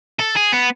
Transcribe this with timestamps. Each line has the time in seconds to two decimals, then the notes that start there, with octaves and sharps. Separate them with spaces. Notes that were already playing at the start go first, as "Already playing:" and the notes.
0.20 A4
0.37 G#4
0.53 B3